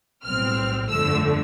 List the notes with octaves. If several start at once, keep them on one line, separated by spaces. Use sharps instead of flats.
B1 A2 G3 C4 F6
G1 F2 D3 A3 E6